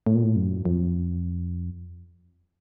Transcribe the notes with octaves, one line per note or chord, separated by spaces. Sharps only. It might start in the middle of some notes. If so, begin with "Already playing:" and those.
A2
A#2
A2
F#2
F2